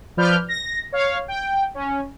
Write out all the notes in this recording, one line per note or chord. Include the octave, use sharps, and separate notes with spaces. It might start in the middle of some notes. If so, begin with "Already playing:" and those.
F3 B4 D5 F6 G6
A#6
C#5 F5
G5
C#4